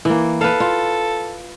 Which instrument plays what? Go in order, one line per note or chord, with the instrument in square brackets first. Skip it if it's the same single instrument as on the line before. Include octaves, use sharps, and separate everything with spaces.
[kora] E3 A#3
[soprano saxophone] A4 [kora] B4 F5
[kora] F4